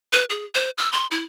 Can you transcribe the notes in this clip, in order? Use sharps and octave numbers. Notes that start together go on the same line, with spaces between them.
B4
G#4
C5
E6
C6
E4